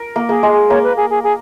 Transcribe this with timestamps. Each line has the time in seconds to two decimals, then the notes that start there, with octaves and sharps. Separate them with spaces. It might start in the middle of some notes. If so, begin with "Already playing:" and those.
Already playing: A#4
0.16 A#3
0.29 A#3 G#4
0.43 G#3
0.69 A#3 C#5
0.83 B4
0.97 G#4
1.10 G#4
1.23 G#4